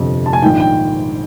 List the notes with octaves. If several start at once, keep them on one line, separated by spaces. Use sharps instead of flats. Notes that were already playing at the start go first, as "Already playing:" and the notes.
Already playing: G1 F2 C3
A5
G#5
A#1 G#2 D#3 G5
G5